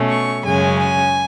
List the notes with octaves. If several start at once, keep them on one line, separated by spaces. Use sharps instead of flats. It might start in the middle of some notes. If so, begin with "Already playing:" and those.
Already playing: B2 A3 C#4
C#6
F#2 C#3 G#3 C#4 G#5
G#5